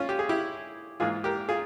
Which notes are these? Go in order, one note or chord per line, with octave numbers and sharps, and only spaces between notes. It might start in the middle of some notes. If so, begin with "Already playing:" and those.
Already playing: C#4 F4
G4
G#4
E4 G4
G#2 E3 A#3 F4 G#4
G4 A#4
F4 G#4